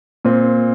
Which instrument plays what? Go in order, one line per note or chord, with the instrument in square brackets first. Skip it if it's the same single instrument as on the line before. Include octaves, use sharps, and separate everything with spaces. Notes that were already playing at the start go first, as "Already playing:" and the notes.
[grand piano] A#2 C4